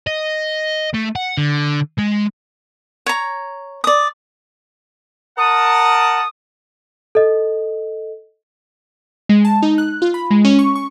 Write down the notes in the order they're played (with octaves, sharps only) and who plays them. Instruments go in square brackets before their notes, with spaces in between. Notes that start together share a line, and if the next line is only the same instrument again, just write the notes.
[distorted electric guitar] D#5
A3
F#5
D3
G#3
[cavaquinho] C#5 A#5
D5 D#6
[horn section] A#4 F#5 A5 [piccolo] D#6
[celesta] A4 D#5
[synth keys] G#3
A5
D#4
F#6
F4
B5
G#3
C#4
C#6
C#6